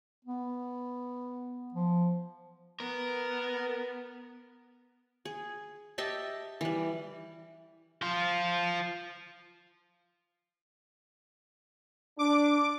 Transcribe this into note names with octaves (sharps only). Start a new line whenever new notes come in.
B3
F3
B3 A#4
G#4
G4 D#5 E5 A5
E3 G3
F3 F4
D4 D6